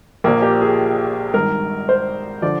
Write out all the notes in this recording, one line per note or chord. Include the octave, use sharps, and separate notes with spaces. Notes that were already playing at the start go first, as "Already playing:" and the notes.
A#1 A#2 F3 A#3
G4
G#4
G#1 G2 D#3 A#4
C5
D3 F3 D5